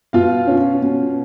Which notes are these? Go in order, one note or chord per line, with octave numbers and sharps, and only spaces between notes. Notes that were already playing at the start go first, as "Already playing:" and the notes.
B2 F4 F5
C#4
B2